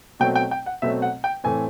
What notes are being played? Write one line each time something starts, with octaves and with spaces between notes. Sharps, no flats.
B2 F#3 A3 C4 G5
G5
G5
F#5
B2 F#3 A3 C4 E5
F#5
G5
A2 E3 A3 C4 G#5